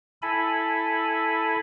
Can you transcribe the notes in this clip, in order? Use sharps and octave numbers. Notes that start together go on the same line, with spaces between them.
E4 A4 G#5 B5